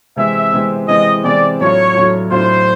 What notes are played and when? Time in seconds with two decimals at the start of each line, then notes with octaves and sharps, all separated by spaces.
0.16 C3 E3 G#3 C4 E5
0.52 C3 E3 G#3 C4
0.88 C3 E3 G#3 C4 D#5
1.24 C3 E3 G#3 C4 D5
1.59 A2 F#3 A3 D4 F4 C#5
1.95 A2 F#3 A3 D4 F4
2.30 A2 F#3 A3 D4 F4 C5